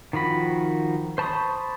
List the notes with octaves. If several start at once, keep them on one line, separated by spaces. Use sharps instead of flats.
D#3 F3 F#4 B5
C5 A5 B5 C#6 D#6